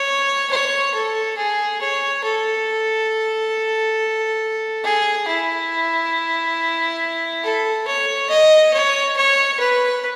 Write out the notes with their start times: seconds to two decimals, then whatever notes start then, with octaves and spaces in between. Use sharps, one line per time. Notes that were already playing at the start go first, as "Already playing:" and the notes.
Already playing: C#5
0.51 C#5
0.94 A4
1.37 G#4
1.81 C#5
2.24 A4
4.83 G#4
5.28 E4
7.44 A4
7.87 C#5
8.30 D#5
8.73 C#5
9.17 C#5
9.60 B4